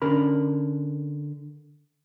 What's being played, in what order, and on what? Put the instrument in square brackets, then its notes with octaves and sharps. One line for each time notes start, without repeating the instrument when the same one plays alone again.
[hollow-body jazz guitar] D3 C#4 A#4 B5